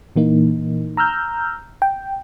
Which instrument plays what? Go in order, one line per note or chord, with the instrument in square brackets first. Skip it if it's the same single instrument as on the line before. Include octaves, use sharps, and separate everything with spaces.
[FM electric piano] A#2 E3 A#3 D#4
A#5 E6 F6 G6
G5